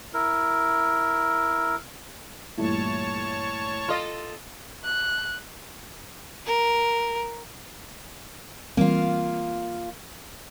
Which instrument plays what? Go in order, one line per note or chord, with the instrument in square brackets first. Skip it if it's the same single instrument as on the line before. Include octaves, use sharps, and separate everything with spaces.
[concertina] E4 A#4
[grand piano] G2 A#2 E3 [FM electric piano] A3 E4 [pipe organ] C#5 A5 C#6
[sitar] F4 A4 D#5
[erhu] F#6
[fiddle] A#4
[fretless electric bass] E3 G3 C4 [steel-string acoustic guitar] A#3 F4